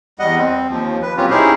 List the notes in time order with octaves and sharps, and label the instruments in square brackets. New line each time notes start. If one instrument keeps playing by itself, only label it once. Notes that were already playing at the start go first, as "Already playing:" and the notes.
[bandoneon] E2 G3 D#5 F#5
C4
D#2 F3
B4
A#2 F#3 C4 C#4 F4 G4
C#4 D#4 E4 G4 G#4 C5